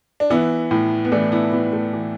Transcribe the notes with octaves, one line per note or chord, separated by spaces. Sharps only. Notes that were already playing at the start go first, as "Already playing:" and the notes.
D4
E3 B3 E4
A2
B3
E3 A3 D4
B3 E4
E3 B3
A3
E3